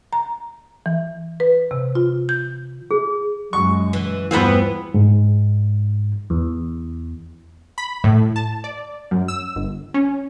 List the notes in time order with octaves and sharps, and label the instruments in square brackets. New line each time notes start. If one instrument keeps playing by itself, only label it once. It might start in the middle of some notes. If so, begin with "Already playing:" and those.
[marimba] A#5
E3
B4
C3
F4
G6
[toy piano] G#4
[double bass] F#2 G#3 [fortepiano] C#6
[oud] E3
[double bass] E2 G2 [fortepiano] E3 B5 [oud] B3 C4 F4
[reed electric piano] G#2
[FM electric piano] E2
[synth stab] B5
A2
A5
D5
F#2
E6
G1
C#4